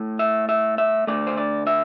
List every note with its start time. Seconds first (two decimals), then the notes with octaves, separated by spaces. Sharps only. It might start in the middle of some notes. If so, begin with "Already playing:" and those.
Already playing: A2 A3
0.19 E5
0.49 E5
0.78 E5
1.07 D2 C3 A3 D5
1.27 C5
1.37 D5
1.67 E5